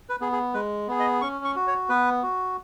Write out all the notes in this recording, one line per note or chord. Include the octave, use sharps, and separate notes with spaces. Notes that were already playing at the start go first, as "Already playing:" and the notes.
B4
B3 G#4
G#4
G#3 B4
B3 G#4
D#5
C#4 C#6
C#6
F#4
C#5
B3 B4
F#4